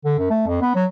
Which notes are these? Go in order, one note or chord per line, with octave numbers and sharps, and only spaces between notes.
D3
F#2
A3
F2
B3
F#3